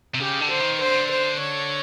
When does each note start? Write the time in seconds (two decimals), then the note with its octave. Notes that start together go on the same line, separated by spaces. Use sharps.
0.15 C3
0.20 C#3 G4
0.41 D3
0.50 C5
0.60 D#3
0.81 D3 C5
1.11 C5
1.41 C#5